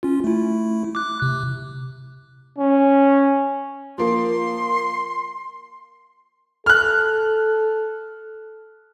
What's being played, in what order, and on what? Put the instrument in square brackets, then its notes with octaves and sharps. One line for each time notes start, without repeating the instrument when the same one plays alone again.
[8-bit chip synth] C#4 F4
A3 E4
D6 F#6
C3
[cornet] C#4
[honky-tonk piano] F3 A#3 [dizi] C6
[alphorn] A4 [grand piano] F6 F#6